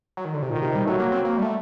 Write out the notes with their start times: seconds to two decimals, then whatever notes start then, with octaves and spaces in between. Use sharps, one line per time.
0.17 F#3
0.25 D#3
0.34 D3
0.42 C3
0.50 A#2 D#3
0.62 C3
0.75 G3
0.87 F#3 A3
1.00 A#3
1.12 C4
1.25 A#3
1.38 G3
1.43 A3